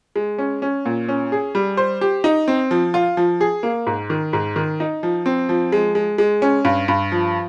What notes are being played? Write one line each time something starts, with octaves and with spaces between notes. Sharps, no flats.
G#3
C#4
C#4
A#2
C#4
G#4
G3
C5
G4
D#4
C4
F3
F4
F3
G#4
A#3
G#2
D#3
G#2
D#3
D#4
F3
C4
F3
G#3
G#3
G#3
C#4
G2
G2
F3